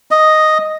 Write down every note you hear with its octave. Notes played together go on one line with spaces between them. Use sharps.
D#5